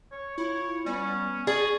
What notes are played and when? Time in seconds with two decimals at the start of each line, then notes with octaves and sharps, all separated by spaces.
0.12 C#5
0.38 E4 F4 C#5
0.86 G3 B3 C#4
1.47 G#4 D5 C#6